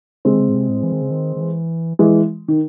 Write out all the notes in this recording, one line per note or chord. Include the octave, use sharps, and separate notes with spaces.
C#3 G#3 C4
D#3
C#3
A2
C3
A2
E3
D#3
C#3
D#3
D#3
E3
E3 G#3
D#3